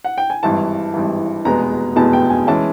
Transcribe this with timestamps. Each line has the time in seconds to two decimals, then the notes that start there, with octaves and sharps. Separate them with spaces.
0.04 F#5
0.18 G5
0.30 G#5
0.43 G#1 G2 E3 A5
0.94 G#1 G2 E3
1.45 F1 E2 B2 G#3 B3 A#5
1.96 F1 E2 B2 G#3 B3 A5
2.13 G5
2.30 G#5
2.47 E3 G#3 C#4 A5